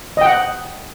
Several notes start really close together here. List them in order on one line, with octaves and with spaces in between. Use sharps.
D#5 G5 F#5